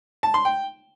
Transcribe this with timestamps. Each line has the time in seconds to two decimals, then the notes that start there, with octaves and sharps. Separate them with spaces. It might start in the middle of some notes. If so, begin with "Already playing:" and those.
0.23 A5
0.34 C6
0.45 G5